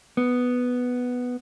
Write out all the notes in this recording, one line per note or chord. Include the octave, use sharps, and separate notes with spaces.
B3